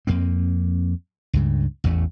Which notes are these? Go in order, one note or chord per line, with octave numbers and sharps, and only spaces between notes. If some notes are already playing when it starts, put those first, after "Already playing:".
F2 A#3 C4
C#2 G2 C#3
A1 E2 A3